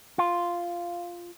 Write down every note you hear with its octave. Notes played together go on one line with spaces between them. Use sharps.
F4